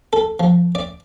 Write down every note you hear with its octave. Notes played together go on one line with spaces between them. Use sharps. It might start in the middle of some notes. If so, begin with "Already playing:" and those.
A4
F3
D5